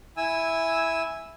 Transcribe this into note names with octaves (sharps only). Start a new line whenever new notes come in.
E4 G#5 E6